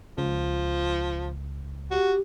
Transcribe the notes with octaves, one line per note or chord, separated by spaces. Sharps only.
C#2 F3
F#4 G4